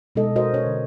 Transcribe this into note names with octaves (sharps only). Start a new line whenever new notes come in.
B2 G#3 B3 D#4 A4 D#5
F#4 A#4 C5 D#5
C#4 C#5
D3